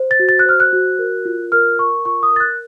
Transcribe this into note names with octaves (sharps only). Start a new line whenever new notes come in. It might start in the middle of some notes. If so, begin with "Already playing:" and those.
Already playing: C5
A6
F#4
A6
F#6
C5 F6
F#6
F#4
A#4
F4
A#4 F6
A#4 C#6
F4 C#6
D#6
A#4 A6
F#6